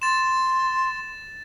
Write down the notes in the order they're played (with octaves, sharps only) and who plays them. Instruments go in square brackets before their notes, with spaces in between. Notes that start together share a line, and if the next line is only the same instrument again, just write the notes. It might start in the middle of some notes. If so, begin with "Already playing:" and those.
[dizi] C6 [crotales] A6 E7